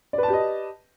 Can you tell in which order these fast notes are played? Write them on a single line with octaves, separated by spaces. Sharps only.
D5 B4 A5 G4 D#5